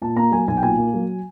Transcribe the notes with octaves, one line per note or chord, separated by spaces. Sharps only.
A#2 A5
A#3 A#5
F#3 G#5
B1 G#5
G5
A#2 G#5
A#3
F#3